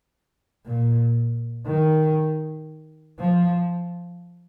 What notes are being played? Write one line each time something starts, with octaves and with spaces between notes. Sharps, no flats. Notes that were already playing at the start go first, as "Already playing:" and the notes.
A#2
D#3
F3